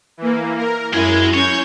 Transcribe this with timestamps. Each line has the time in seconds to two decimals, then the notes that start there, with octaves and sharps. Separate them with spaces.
0.17 E3 A#3
0.58 A#4
0.93 F#2 G#3 E4 G#5
1.34 C#4 C#5 G6